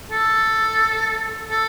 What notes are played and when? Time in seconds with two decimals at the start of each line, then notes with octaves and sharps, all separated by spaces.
0.11 A4
1.50 A4